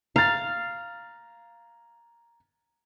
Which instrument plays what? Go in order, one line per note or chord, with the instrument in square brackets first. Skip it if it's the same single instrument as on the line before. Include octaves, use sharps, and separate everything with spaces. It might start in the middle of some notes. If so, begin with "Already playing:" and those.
[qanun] F5 [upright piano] A#5 A6